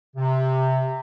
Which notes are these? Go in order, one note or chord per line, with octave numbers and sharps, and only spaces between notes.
C3